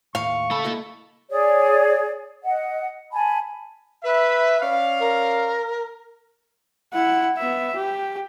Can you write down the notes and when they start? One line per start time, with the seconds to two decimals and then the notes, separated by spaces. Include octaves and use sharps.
0.15 D#2 A2 F5 C#6
0.51 C#3 A3 A4 B5
0.64 A#3 E4 D#5
1.30 G#4 C#5 D5
2.44 D#5 F#5
3.13 G#5 A5 B5
4.03 B4 E5
4.60 C#4 D5 F5
4.99 A#4
6.94 E4 F#5
7.37 B3 E5
7.76 G4